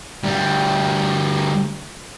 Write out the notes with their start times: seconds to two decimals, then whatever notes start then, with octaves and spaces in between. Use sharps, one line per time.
0.24 D2 G3